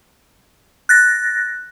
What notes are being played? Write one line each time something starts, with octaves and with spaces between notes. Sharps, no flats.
F#6 A6 A#6